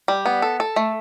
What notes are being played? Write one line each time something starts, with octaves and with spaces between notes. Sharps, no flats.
G3
B3
A4
A4
A3